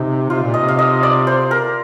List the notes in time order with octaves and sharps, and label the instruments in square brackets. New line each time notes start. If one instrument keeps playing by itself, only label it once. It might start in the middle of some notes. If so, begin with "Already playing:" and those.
Already playing: [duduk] C3 [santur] D#4
[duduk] C3 [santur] F4
[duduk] A#2
[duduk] C3 [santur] D#5
[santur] F5
D#5
D5
C5
A#4